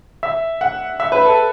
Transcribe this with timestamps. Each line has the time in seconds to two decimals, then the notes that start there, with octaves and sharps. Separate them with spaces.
0.23 E5
0.61 F#5
1.00 E5
1.12 B4
1.25 A4